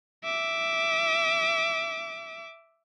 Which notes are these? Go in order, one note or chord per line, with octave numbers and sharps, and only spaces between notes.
E5 D6